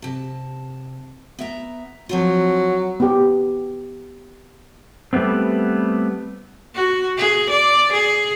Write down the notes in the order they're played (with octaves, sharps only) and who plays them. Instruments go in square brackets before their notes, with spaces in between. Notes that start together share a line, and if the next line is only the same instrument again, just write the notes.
[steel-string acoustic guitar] C3 A5
B3 E5 A#5
[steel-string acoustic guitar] F3 C4 F4 [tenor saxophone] F#3
[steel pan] B3 G4
[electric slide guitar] G3 A3 B3 C4
[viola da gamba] F#4
G#4
D5
G#4